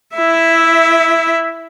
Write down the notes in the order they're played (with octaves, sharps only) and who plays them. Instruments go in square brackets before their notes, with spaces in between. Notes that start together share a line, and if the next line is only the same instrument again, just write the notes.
[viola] E4 E5